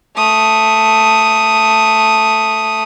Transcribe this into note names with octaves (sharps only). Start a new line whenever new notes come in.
A3 D#6